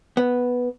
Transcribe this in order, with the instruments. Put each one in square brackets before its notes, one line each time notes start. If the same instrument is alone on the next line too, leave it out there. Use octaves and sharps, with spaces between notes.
[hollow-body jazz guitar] B3